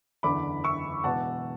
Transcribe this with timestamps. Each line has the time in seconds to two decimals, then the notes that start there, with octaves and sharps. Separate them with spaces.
0.23 F#1 E2 D3 B5 D6
0.64 C#6 E6
1.04 E1 E2 B2 F#5 A5